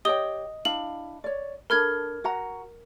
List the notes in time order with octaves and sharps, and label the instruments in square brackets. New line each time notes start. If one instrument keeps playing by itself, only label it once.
[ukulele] G4 C#5 G5 [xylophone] D#5 D#6 G7
[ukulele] D4 E4 F5 [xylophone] F#7
[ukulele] C#5 D5
[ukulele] D4 A4 B5 [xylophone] A#4 F6 G#6
[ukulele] F#4 F#5 A#5